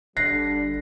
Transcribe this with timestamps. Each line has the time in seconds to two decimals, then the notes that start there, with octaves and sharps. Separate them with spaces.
0.17 G1 D3 G3 F#6 A#6 C7